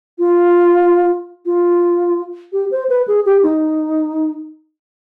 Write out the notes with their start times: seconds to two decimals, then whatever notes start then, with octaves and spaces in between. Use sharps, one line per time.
0.19 F4
1.46 F4
2.53 G4
2.71 C5
2.89 B4
3.08 G#4
3.25 G4
3.43 D#4